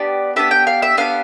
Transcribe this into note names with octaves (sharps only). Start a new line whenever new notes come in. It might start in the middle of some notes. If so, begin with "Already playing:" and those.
Already playing: B3 D4 G4 D5
B3 D4 G4 E5
G5
F5
E5
B3 D4 G4 F5